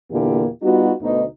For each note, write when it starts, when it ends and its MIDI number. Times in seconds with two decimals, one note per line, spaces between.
0.11 0.47 40
0.11 0.47 46
0.11 0.47 50
0.11 0.47 58
0.11 0.47 64
0.11 0.47 67
0.63 0.92 55
0.63 0.92 59
0.63 0.92 63
0.63 0.92 65
0.63 0.92 66
1.02 1.22 38
1.02 1.22 47
1.02 1.22 63